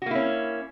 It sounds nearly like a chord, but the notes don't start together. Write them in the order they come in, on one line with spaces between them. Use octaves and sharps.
F#4 A#3 E4 C#4